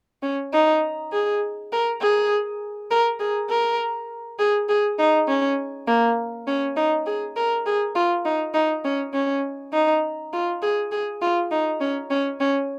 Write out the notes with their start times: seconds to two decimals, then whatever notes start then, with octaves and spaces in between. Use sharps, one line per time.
0.23 C#4
0.53 D#4
1.13 G#4
1.72 A#4
2.02 G#4
2.91 A#4
3.20 G#4
3.50 A#4
4.39 G#4
4.69 G#4
4.99 D#4
5.28 C#4
5.87 A#3
6.47 C#4
6.76 D#4
7.06 G#4
7.36 A#4
7.66 G#4
7.95 F4
8.25 D#4
8.54 D#4
8.85 C#4
9.13 C#4
9.73 D#4
10.33 F4
10.62 G#4
10.92 G#4
11.22 F4
11.51 D#4
11.81 C#4
12.10 C#4
12.40 C#4